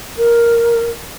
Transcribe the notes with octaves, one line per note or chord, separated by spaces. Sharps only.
A#4